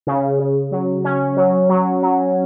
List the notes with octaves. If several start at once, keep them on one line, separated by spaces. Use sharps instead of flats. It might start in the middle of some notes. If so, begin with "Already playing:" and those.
C#3
C#3
F#3
C#4
F#3
F#3
F#3